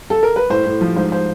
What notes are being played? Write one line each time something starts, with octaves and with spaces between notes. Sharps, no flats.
A4
A#4
B4
A2 C5
A2
F3
G#2 C5
C5